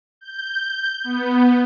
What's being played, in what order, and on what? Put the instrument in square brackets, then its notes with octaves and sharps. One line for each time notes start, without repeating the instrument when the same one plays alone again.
[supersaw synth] G6
B3